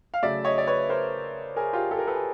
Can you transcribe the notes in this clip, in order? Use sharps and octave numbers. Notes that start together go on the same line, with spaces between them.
F5
C#3 F#3 A3 D5 E5
C#5 D#5
D5
B4 C#5
A#4 C5
G#4 A#4
F4 G4
G4 A4
A#4
A4 B4
G#4